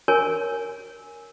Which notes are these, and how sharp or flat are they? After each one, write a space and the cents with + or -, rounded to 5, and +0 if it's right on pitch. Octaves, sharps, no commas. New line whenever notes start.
A#4 +0 C#5 +0 G#5 +0